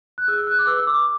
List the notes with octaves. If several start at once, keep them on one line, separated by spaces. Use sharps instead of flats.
F#6
G#4 E6
F#6
D6
B4 E6
E6
D6